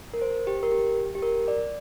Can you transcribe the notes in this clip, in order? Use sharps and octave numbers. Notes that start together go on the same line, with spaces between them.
A#4
C5
G4
A#4
G4
G4
A#4
D5